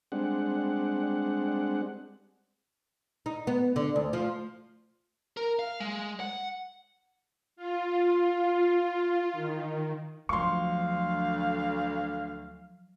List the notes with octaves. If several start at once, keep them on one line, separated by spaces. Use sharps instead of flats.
G3 G#3 C4 D4 F#5
D#4
B3
D3
D2
F3
A#4
F5
G#3
F#5
F4
D#3
D2 F3 F#3 F5 C6 C#6